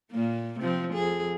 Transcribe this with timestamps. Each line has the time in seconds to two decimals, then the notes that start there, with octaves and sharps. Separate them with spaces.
0.12 A#2 A#3
0.59 C3 F3 C4
0.94 F2 G#4